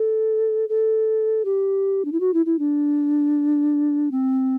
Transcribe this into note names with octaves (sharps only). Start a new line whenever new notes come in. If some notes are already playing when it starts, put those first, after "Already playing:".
Already playing: A4
A4
G4
D4
E4
F#4
E4
E4
D4
C4